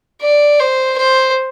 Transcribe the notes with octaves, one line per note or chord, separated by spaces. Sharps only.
D5
C5
C5